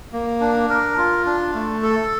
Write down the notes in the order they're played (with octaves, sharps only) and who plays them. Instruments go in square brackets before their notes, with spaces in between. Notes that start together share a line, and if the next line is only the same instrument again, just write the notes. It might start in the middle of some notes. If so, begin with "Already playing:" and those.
[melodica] A#3
D4
A#4
F4
D4
A3
A4